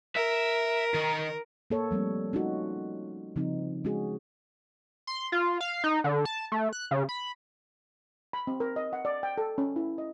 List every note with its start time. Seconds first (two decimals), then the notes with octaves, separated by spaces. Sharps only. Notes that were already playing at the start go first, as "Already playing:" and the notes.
0.16 A#4 E5
0.94 D#3
1.71 A#3 A4 C#5
1.91 F3 G3 A3 C4
2.33 C#4 D#4 F4 F#4
3.36 C#3 F3 C4 D#4
3.85 G#3 C#4 F#4 G#4
5.07 C6
5.32 F4
5.61 F5
5.84 D#4
6.04 D3
6.25 A5
6.52 A3
6.73 F#6
6.91 C#3
7.09 B5
8.33 B5
8.47 C4
8.60 A#4
8.76 D#5
8.93 F#5
9.05 D5
9.23 G5
9.38 A4
9.58 C#4
9.76 E4
9.98 D#5